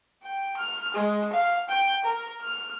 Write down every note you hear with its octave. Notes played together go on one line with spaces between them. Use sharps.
G5
F6
G#3
F5
G5
A#4
F6